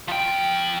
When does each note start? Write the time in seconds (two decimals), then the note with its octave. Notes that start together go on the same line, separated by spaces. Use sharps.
0.08 F3 G5